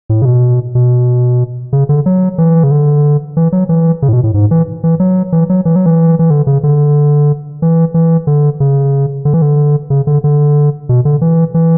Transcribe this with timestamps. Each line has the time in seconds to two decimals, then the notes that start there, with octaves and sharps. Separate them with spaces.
0.10 A2
0.22 C#3
0.25 B2
0.75 B2
1.73 C#3
1.89 D3
2.06 F#3
2.38 E3
2.64 C#3
2.71 D3
3.37 E3
3.52 F#3
3.69 E3
4.02 C#3
4.09 A2
4.13 B2
4.23 A2
4.34 G#2
4.51 E3
4.84 E3
5.00 F#3
5.32 E3
5.49 F#3
5.65 E3
5.76 F#3
5.86 E3
6.19 E3
6.30 D3
6.47 C#3
6.63 D3
7.62 E3
7.94 E3
8.27 D3
8.60 C#3
9.25 D3
9.34 E3
9.42 D3
9.90 C#3
10.07 D3
10.24 D3
10.89 B2
11.05 D3
11.21 E3
11.54 E3